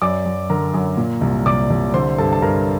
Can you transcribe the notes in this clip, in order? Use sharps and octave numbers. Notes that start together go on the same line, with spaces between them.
F#2 D5 D6
F#2
D3 A#4 A#5
F#2
A#2
C2
C2 D5 D6
C2
D3 C5 C6
G2 A4 A5
A5
G2 A#4 A#5